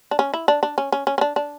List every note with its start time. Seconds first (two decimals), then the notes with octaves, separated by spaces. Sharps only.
0.11 D4
0.19 C#4
0.34 E4
0.48 D4
0.63 D4
0.78 C#4
0.92 C#4
1.07 C#4
1.18 C#4
1.21 D4
1.36 D4